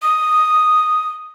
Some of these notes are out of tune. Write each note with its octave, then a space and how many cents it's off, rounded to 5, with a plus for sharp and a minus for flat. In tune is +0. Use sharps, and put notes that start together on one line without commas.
D#6 +0